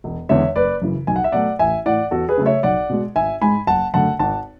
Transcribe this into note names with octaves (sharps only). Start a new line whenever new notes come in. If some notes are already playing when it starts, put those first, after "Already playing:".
E1
E2 D3 G#3 C#5 E5
F#1 B4 D5
F#2 C#3 E3
B1 G#5
F#5
E5
B2 F#3 A3 D5 F#5
A1 E5 G#5
A2 E3 D5 F#5
E2 F#4 A4
G#4 B4
C#3 F#3 A3
C#5 E5
B1 D5 F#5
B2 G#3
G#1 E5 G#5
G#2 G#3 G#5 B5
F#1 F#5 A5
F#2 D3 A3 F#5 A5
G#1 F#5 A5